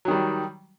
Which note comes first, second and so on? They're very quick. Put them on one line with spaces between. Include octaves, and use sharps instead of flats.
F#3 D#3 G3